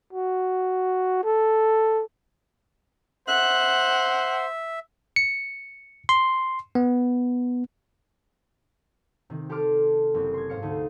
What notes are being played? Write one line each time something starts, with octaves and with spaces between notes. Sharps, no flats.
F#4
A4
C5 E5 F#5 F#6
C#7
C6
B3
C3 D#3
G4 A4 A5 C6 D6 F6
F#1 C4
C6 G#6
G#2 C5 F5 C#7
D2 C3 A3 D#4